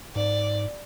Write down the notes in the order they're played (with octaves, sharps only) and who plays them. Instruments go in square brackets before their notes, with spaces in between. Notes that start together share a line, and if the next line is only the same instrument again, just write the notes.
[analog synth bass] G#2 [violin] D5